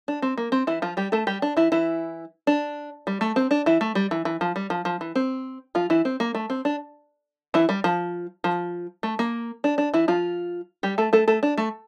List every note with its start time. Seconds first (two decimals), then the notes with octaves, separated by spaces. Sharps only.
0.08 D4
0.22 C4
0.38 A#3
0.52 C4
0.67 E3 E4
0.82 F3 F4
0.97 G3 G4
1.12 A3 A4
1.27 G3 G4
1.42 D4
1.57 E3 E4
1.72 E3 E4
2.47 D4
3.07 G3
3.21 A3
3.36 C4
3.51 D4
3.66 E3 E4
3.81 A3
3.95 G3
4.11 E3
4.25 E3
4.41 F3
4.56 G3
4.70 F3
4.85 F3
5.01 E3
5.15 C4
5.75 F3 F4
5.90 E3 E4
6.05 C4
6.20 A#3
6.35 A3
6.50 C4
6.65 D4
7.54 E3 E4
7.69 G3
7.84 F3
8.44 F3
9.03 A3
9.19 A#3
9.64 D4
9.78 D4
9.94 E3 E4
10.08 F3 F4
10.83 G3 G4
10.98 A3 A4
11.13 A3 A4
11.28 A3 A4
11.43 D4
11.57 A3